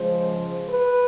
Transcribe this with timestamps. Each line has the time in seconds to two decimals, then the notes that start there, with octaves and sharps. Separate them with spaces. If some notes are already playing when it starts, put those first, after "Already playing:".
Already playing: C#3 F3 G#3 C5
0.69 B4